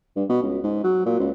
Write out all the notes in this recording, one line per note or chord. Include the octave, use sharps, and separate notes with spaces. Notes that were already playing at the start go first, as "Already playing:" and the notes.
G2
B2
C#2
G#2
F#3
A#2
C#2